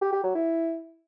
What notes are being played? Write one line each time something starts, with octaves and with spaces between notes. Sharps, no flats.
G4
G4
F#3
E4